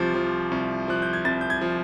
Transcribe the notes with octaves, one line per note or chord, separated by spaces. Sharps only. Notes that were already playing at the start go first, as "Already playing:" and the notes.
Already playing: C2 C3 F3
F3
C2
F3 F#6
G6
G#6
C2 A6
G6
G#6
F3